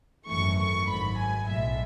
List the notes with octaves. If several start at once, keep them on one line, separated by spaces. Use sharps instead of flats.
G#1 F#2 E3 A3 C#6
C#6
G#1 G#2 F#3 B5
G#5
B1 A2 G#3 E5